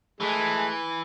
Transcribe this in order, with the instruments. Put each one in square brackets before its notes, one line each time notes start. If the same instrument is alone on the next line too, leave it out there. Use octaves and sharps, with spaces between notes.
[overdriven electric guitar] E3 [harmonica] G#3 A3